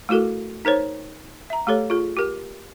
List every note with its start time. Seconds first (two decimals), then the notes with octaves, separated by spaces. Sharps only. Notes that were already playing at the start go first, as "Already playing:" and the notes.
0.09 A3 E4 F#4 A4 A#4
0.65 D#4 A#4 C5 C#5
1.50 E5 A#5
1.67 A3 G4 A4 C#5
1.90 F4 G#4
2.17 G4 A#4